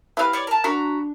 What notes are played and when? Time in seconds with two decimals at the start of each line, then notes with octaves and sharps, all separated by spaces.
0.17 C4 E4 G4 B4 F5
0.33 C#5 D5
0.47 A#4 A5
0.64 D4 F#4 A#4 A#5 B5